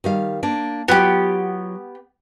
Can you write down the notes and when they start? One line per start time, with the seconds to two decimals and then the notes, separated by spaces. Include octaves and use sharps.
0.04 D#3 G3 F5
0.43 A#3 D4
0.88 F#3 B3 F4 G4